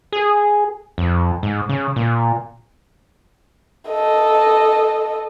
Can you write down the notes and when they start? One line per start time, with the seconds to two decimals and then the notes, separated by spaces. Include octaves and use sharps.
0.13 G#4
0.98 F2
1.43 G#2
1.69 C#3
1.96 A#2
3.89 A4 D#5